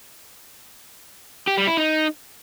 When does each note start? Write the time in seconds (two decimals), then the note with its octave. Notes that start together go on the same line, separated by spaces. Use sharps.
1.47 G4
1.57 G3
1.67 E4
1.77 D#4